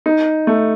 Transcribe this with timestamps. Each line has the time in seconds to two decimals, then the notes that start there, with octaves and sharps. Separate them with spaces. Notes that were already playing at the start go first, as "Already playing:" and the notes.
0.06 D#4
0.47 A3